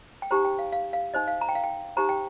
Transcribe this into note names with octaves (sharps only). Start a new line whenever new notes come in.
G5
D#4 G4 C5 A#5
G5
F5
F5
F5
D#4 C5 D#5
F5
A#5
G5
F5
G5
D#4 G4 C5 A#5
G5